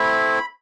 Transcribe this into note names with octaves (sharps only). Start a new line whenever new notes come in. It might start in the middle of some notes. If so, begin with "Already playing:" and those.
Already playing: A3 C4 E4 B5